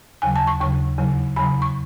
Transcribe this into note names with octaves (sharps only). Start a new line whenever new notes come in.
D#2 C#3 F#3 G#5
A5
C#6
D#2 C#3 F#3 C#6
E2 C#3 F#3
E2 C#3 F#3 B5
C#6